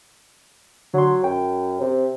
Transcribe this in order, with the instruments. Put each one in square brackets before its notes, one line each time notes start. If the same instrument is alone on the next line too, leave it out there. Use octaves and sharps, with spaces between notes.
[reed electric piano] D3 C6 [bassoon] F#3
[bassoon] F#2 [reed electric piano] G5
[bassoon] C3